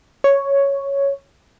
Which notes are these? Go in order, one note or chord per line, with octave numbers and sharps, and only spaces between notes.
C#5